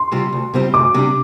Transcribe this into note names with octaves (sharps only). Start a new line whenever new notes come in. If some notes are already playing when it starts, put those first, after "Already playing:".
Already playing: C6
C3 G3 C4 F4
D2
C3 G3 C4 F4
D2 D6
C3 G3 D4